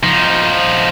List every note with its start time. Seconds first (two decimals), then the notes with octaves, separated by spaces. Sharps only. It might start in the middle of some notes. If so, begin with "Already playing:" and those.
0.03 F3 D#4